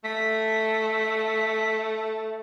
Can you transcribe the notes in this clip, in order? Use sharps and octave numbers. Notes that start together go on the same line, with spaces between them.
A3 B6